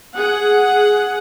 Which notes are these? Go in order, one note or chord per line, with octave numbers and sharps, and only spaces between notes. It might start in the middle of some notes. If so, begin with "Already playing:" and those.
G#4 F#5